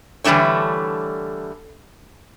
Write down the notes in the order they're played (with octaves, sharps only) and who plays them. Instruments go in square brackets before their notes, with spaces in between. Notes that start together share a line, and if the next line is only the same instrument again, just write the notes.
[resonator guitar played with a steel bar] D3 E3 G3 A3 D4 C#5